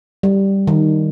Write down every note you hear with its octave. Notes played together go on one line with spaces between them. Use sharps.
G3
D#3